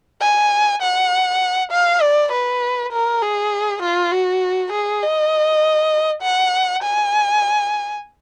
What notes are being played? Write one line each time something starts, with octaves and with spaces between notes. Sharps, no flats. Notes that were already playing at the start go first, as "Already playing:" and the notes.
G#5
F#5
F5
D5
B4
A#4
G#4
F4
F#4
G#4
D#5
F#5
G#5